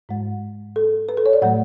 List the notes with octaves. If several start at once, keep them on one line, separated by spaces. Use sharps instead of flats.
G#2 G#3
A4
B4
A4
C#5
D5
A2 F#3 A3 F#5